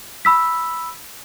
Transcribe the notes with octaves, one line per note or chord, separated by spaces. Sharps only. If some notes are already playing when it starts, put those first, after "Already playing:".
B5 E6 B6